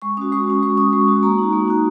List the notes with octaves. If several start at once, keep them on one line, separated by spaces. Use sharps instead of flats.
G#3 C#6
C#4 F#4 D#6
G#3 C#6
C#4 F#4
G#3 C#6
C#4 F#4 D#6
G#3 C#6
C#4 F#4
A#3 A#5
D#4 F#4
A#3
D#4 F#4